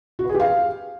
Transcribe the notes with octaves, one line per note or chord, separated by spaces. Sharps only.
F#4
B4
G#4
G4
F5